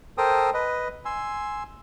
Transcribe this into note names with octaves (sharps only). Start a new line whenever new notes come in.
A4 A#4 C5 G5 D#6
B4 D#5
G#5 C6 E6